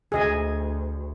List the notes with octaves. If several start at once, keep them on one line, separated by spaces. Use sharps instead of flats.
D2 G#4 D#5 G#5